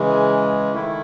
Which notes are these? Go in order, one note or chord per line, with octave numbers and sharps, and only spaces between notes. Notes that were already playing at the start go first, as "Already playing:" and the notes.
Already playing: C#3 E3 G#3
D#3 A3 E4